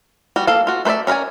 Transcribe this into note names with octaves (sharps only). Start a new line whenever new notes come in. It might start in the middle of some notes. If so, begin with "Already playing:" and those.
G3 F#4
A#3 A4 F5
F4 F#4
A3 B4 C5 D5 E5
C#4 A#4 B4 D5 G#5